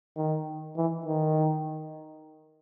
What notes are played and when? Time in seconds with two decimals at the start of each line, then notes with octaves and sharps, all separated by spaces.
0.17 D#3
0.77 E3
1.06 D#3